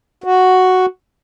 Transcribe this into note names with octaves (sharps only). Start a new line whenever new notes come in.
F#4